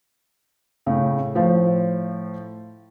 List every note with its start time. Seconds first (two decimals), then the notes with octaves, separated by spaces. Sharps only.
0.86 A2 C#3
1.35 A2 F3